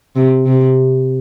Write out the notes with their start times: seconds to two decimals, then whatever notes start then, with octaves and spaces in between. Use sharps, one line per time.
0.16 C3
0.46 C3